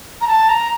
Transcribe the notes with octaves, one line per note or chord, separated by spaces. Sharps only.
A#5
A5
A#5